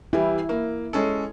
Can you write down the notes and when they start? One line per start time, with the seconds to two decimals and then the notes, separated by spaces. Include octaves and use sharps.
0.13 E3 G3 E4
0.49 A#3
0.93 G#3 C#4 A4